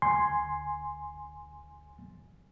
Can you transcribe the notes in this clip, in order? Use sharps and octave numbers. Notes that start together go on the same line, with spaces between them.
D2 G#5 C6